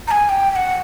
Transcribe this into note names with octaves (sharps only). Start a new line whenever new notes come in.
A#5
G#5
G5
G5
F#5